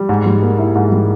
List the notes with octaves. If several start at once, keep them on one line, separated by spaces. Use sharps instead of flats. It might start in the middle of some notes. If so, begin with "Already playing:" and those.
Already playing: G3
G#2
G3
A#3
E4
G#2
G3